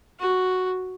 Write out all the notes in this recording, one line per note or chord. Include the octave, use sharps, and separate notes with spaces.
F#4